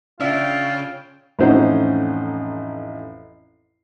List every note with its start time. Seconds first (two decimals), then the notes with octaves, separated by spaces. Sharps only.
0.20 C#3 D4 F4 E5 G5
1.39 A1 F2 C#4 D#4 C5 F#5